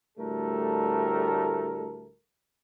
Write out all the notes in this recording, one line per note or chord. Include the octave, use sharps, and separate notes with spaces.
D2 A2 G3 A3 A4 A#4